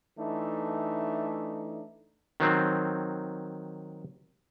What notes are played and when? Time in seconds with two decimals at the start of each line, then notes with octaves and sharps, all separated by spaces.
0.19 E3 A3 D4 D#4
2.40 D#3 F#3 C4